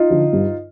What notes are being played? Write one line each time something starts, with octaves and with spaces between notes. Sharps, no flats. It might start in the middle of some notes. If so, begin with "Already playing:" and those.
Already playing: D#4 F4
D3 F3
G2